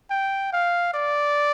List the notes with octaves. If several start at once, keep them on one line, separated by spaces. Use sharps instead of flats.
G5
F5
D5